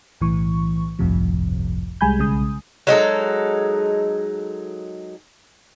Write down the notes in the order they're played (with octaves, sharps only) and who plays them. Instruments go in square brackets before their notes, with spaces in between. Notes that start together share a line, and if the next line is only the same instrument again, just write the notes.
[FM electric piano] B1 A2 E3 C#6
G1 C2 F2 A2 C3 F3
C2 G3 G#3 G#5 B5 G6
B1 C#3 G#3 D#6
[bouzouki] F#3 G#3 D#4 A4